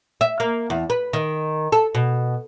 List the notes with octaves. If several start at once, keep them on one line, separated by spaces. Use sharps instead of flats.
E5
A#3
E2
B4
D#3
A4
B2